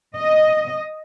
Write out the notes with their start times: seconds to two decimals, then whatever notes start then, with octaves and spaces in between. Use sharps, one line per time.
0.17 D#5